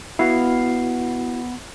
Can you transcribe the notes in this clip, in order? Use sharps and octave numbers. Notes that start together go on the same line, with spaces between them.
B3 E4 F#4 F5